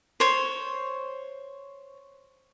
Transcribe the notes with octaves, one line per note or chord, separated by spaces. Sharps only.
C5 C#5